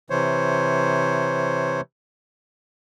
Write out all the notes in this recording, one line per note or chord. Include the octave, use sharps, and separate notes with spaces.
C3 E3 C5 C#5